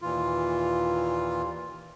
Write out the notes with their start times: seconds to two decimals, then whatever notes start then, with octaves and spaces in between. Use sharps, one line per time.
0.02 D#2 A#2 E3 F4